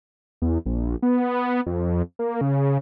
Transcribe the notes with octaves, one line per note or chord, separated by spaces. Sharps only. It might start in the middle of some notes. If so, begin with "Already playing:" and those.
E2
A#1
B3
F2
A#3
C#3